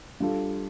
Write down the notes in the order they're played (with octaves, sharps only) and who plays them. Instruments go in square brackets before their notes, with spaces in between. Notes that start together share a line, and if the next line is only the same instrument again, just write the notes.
[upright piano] G3 D4 F4 A4